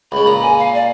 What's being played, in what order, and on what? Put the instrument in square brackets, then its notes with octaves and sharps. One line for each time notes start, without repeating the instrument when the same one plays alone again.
[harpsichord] C#2 C#3 [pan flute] B5
[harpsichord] A#2 A#5
[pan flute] G#5
F5
D5